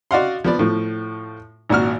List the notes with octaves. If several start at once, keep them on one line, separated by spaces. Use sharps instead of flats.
F#4 D5 D#5 F5 F#5 C6
F3 B3 D5
A2 F3
G#1 A#2 F#4 F6